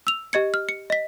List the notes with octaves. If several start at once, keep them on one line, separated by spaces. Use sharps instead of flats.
E6 F7
G4 D#5 G#6 C#7
F6
C#7
D#5 B6